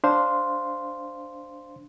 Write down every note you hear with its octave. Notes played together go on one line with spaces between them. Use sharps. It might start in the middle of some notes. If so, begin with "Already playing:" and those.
D4 C5 F5 C6